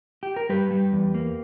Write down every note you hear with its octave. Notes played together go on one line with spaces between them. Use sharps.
G4
A#4
G3 G4 B4
G3
E2
A#3